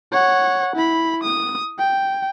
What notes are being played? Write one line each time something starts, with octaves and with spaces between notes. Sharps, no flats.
C#5 F#5
E4 B5
D#6
G5